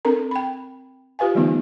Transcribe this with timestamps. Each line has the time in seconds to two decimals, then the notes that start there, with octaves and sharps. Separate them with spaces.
0.05 C4 D4 A4 A#4 A#5
0.31 G5 B5
1.19 F4 G4 B4 F5 G#5
1.35 D3 E3 G3 A3 B3 D#4